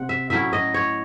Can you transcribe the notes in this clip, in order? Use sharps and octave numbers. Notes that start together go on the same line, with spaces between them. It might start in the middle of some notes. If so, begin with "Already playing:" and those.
Already playing: C3 C4 F#5
E5
A2 F#3 C#4 E4 E5
D#5
C#5